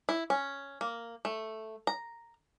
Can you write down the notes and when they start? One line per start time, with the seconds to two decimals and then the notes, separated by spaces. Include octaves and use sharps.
0.09 E4
0.30 C#4
0.81 A#3
1.25 A3
1.87 A#5